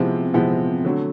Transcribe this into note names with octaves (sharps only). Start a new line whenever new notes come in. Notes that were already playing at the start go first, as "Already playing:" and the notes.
Already playing: C3 F3 G#3 B3 E4
C3 F3 G#3 B3 E4
D3 F#3 A3